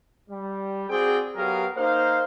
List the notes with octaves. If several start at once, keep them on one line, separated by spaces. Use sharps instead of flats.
G3
C4 F#4 G#4 D5 G5
F#3 B3 G4 G#4 A#4 F5
A#3 D#4 C5 F5